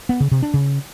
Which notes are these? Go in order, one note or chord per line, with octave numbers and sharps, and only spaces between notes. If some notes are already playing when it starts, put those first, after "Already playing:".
B3
C#3
C3
D4
C#3